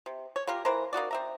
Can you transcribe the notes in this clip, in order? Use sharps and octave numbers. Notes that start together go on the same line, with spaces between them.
C3
C#5
A#3 F4 G4 A#4
E3 A#4 C5 A#5
A#3 D#4 F#4 D5
C4 E5 A#5